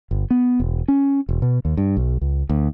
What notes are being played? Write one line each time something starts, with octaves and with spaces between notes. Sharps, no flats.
G1
B3
E1
C#4
E1
B2
D#2
G2
B1
C#2
D2